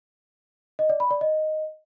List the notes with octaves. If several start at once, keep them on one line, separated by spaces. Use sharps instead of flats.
D#5
D5
B5
D5
D#5